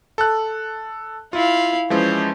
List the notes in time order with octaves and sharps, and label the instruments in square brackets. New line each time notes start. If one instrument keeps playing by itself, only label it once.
[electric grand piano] A4 F#6
[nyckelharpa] E4 F5 [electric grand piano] F4
[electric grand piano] E3 F3 G#3 [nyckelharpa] C#4 C5